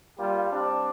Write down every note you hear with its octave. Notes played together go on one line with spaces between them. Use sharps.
G3 A#3 F4 G4
G3 C4 D4